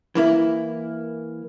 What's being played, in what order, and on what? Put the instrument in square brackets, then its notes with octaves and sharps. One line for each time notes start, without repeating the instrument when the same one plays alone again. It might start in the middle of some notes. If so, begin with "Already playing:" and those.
[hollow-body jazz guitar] E3 A#3 E4